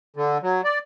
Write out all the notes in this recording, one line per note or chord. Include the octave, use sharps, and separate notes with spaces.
D3
F#3
D5